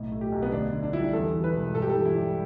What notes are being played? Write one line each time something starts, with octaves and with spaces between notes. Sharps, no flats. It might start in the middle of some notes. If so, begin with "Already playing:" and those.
Already playing: B1 A2
A3
G4
B1
B3
D2 D4
D3
D4
G3 E4
D4
E2 A4
E3
B4
E1
G2 A4
G4
A4
E3
E4
G3